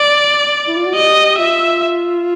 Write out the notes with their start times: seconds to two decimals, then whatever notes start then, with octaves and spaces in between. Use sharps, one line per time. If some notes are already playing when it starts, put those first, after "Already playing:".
Already playing: D5
0.68 E4
0.77 F4
0.86 F#4
0.95 G4 D#5
1.38 F4 E5